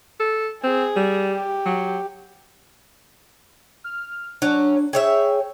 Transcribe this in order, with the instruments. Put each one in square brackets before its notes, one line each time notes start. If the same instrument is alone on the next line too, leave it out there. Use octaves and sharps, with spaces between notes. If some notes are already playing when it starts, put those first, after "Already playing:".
[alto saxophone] A4
[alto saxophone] C4 [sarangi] G#4
[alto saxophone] G3
[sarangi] G4
[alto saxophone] F#3
[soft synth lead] F6
[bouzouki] F#3 C#4 [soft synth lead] D4
[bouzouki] G#4 C#5 E5 [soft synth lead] G5